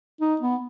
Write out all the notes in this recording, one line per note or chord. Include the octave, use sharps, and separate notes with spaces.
D#4
B3